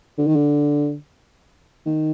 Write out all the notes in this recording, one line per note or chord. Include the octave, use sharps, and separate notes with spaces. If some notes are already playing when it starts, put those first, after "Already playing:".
D3
D#3
D3
D#3